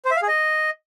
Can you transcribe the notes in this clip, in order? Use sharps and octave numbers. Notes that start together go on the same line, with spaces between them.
C5
E5
F5
G#4
D#5